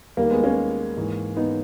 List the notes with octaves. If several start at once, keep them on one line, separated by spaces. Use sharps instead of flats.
D#2 D#3 G3 A#3
G#3 B3
A#3 C#4
G#2 E3
B3 D#4